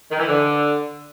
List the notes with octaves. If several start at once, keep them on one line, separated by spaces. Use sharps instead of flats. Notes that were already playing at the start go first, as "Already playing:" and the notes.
D#3
E3
D3